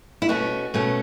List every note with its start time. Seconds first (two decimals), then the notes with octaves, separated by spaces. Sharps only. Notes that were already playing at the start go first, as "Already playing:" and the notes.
0.22 E4
0.29 B2 A3 C#4 F#4
0.74 B2 A3 C#4